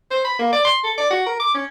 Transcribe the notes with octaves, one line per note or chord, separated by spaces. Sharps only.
C5
B5
A#3
D5
C6
A4
D5
F#4
A#4
D6
C#4